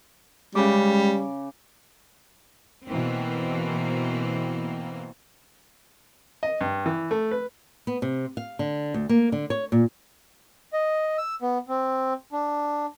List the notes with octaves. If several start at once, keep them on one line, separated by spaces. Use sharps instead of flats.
C#3 G3 G#3 D6
B2 E3 A#3 C4
D#5
G2
E3
A3
B4
B3
C3
F5
D3
D2
A#3
D3
C#5
A#2
D#5
E6
B3
C4
D4